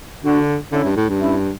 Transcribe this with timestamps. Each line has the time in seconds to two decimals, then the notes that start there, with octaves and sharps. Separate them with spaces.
0.24 D3 D4 F#4
0.72 D3 C#4 E4
0.84 G2
0.97 A2
1.09 G2
1.21 C#4 E4